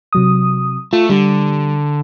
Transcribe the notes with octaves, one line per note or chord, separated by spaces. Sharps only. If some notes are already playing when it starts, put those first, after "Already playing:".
C3 F#3 D#6
A3 F4
D3 G3